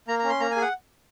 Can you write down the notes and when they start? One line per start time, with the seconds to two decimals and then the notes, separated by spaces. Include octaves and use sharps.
0.08 A#3 A#5
0.19 C#4 A#5
0.29 C6
0.40 A#3 A#5
0.51 G#5
0.56 G#4
0.62 F#5